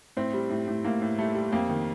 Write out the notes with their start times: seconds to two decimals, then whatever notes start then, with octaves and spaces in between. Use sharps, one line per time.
0.17 A2 C4
0.34 G3
0.50 A2
0.68 A2
0.84 A2 A#3
1.02 A2
1.18 G3 A3
1.35 G3
1.52 F2 A#3
1.69 D#3